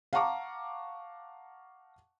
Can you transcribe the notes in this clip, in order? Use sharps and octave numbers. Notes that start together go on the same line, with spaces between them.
F5 F#5 A5 A#5 C#6 D6